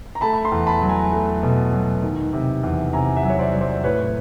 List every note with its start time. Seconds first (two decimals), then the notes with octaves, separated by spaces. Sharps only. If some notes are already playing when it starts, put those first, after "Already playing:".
0.15 A#5
0.21 A3 A5 B5
0.33 B5
0.44 A#5 C6
0.52 E2
0.66 A5 B5
0.82 F#3
0.89 G#5 A#5
1.12 A3
1.43 B2
1.72 F#3
2.03 D#3
2.33 C3
2.63 E2
2.93 C3 G#5 A#5
3.16 E5 F#5
3.23 F#3
3.30 C#5
3.39 C5 D5
3.54 F#3
3.61 C5 D5
3.84 A2 B4 C#5